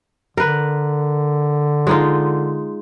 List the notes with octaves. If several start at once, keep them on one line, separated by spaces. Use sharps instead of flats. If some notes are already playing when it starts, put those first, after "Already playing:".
D3 A#4 B4
G#3 D#4 F4